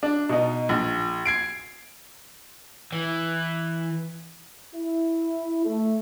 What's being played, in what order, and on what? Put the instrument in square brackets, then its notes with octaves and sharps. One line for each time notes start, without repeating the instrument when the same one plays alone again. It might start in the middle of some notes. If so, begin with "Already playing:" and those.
[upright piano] D4
B2 D#4
A#1
G#6 C7 D7
[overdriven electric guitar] E3
[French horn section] E4
A3